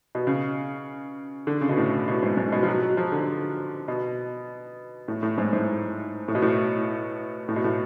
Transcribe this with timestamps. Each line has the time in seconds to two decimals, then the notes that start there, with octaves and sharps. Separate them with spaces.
0.15 B2
0.27 C#3
1.47 D3
1.61 C#3
1.69 B2
1.77 A2
2.08 B2
2.23 G#2
2.37 G#2
2.52 B2
2.63 F3
2.68 F#3
2.82 F#3
2.97 F3
3.12 D3
3.88 B2
5.08 A2
5.23 A2
5.38 G#2
5.53 G#2
6.28 A2
6.35 B2
6.42 A2
7.48 A2
7.56 B2
7.64 A2